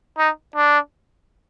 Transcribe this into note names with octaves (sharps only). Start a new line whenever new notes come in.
D#4
D4